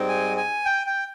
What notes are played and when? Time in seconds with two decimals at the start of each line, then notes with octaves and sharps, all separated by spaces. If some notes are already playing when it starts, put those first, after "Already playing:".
Already playing: G#2 G3 C4 D#4
0.08 G#5
0.37 G#5
0.65 G5
0.87 G5